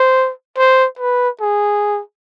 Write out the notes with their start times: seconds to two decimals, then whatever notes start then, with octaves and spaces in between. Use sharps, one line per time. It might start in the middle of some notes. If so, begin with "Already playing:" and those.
Already playing: C5
0.57 C5
0.99 B4
1.41 G#4